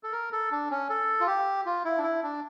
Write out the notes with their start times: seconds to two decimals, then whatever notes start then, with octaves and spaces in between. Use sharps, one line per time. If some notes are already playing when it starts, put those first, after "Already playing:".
0.03 A4
0.12 A#4
0.32 A4
0.52 D4
0.71 C#4
0.90 A4
1.20 F4
1.27 G4
1.66 F4
1.85 E4
1.98 D4
2.03 E4
2.23 D4